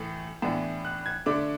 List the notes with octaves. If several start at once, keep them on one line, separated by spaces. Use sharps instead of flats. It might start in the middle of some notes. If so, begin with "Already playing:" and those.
Already playing: A2 E3 A3
A2 E3 B3 D4
F#6
G#6
D3 A3 D4 D6